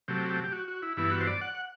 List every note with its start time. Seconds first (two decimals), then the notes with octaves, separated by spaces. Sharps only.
0.08 C3 F#3 A3 G4
0.30 G4
0.44 G4
0.52 F#4
0.68 F#4
0.82 E4
0.97 G2 E3 B3 E4
1.11 F#4
1.21 C5
1.27 D5
1.41 F#5